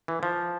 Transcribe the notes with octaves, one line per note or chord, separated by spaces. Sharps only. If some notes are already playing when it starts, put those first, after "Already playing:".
E3
F3